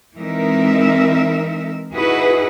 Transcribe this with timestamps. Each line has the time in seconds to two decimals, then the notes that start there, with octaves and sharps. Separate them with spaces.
0.15 E3 G#3 C4 D#4 A#4 E5
1.92 D#4 E4 F#4 G#4 B4